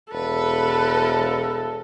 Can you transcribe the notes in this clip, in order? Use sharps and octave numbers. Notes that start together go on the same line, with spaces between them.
E1 A4 B4